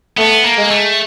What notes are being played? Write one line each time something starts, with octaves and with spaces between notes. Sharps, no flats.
A3 B3
A#3
G#3
A3